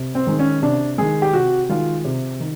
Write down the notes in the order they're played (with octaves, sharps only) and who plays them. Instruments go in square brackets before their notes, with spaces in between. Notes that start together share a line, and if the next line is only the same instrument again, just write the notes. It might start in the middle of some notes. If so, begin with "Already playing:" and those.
Already playing: [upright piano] C3
C4
D#3 G#3
C#4
C3 D4
D#3 G#3 G#4
G4
C3 F#4
D#3 G#3 F4
C3
D#3